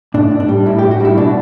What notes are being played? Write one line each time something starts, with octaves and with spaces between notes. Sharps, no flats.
A2 D4
A2
D4
G3
A2 E4
A2 G4
F#4
G3 E4
B2 D4